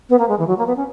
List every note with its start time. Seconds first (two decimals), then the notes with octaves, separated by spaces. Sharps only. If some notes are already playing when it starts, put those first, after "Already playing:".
0.09 B3
0.19 A#3
0.29 G#3
0.39 E3
0.47 F#3
0.58 A#3
0.67 B3
0.76 C#4